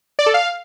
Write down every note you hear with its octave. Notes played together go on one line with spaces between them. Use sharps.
D5
A4
F5